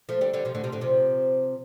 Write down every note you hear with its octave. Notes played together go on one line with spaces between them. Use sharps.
F3 A3
D3 G3
D3 G3
C3 F3
A2 D3
C3 F3
A2 D3
C3 F3